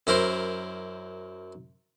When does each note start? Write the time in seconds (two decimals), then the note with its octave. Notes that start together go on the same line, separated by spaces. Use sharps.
0.07 F#2 E4 A#4 C5